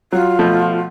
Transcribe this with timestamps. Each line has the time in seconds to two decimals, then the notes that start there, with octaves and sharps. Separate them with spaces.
0.12 F#3 F4
0.39 B2 F3 A3